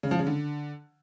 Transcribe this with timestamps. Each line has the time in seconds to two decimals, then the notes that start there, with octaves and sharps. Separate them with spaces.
0.03 C#3
0.11 F3
0.19 C#3
0.27 D3